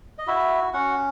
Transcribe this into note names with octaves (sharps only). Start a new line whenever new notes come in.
D#5
E4 F#4 E5
C#4 F#4 F#5